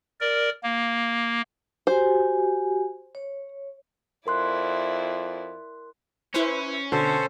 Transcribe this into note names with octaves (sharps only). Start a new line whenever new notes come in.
A#4 D5
A#3
F#4 G4 C5 G#5
C#5
F2 E4 A#4 D5 C6 F#6
C#4 E4 B4 C5
B2 D3 A4 C5